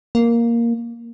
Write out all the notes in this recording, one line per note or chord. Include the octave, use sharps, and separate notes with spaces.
A#3